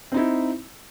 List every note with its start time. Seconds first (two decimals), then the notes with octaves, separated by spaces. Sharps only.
0.12 C4
0.14 D#4
0.17 E4